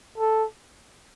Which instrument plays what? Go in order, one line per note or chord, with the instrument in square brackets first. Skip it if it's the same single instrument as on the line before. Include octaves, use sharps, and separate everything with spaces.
[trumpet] A4